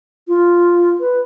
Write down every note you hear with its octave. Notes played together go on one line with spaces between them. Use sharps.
F4
B4